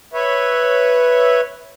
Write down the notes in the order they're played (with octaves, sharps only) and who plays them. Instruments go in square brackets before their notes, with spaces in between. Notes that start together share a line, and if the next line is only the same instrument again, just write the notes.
[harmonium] B4 C#5 E5